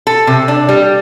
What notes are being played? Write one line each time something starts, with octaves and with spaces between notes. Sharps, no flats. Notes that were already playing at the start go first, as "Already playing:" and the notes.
A4
C3
D4
G3